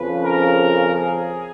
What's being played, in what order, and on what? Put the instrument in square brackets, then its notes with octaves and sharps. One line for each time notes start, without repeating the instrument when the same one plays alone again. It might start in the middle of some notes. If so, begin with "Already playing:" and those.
Already playing: [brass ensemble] F2 C#3 F3 B4
A#4
G#4